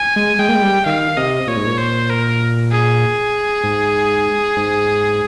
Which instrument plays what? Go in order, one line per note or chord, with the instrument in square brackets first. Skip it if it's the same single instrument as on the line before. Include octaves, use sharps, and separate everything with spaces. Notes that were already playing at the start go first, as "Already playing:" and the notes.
Already playing: [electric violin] G#5
[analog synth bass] G#3
[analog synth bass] G#3 [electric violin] G5
[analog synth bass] A#3
G#3
G3
[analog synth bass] D#3 [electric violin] F5
[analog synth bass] C3 [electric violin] D#5
[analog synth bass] A#2 [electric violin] C#5
[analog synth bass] G#2
A#2
[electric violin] C5
A#4
G#4
[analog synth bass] G#2
G#2